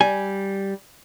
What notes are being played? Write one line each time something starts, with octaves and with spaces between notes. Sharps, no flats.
G3 G#5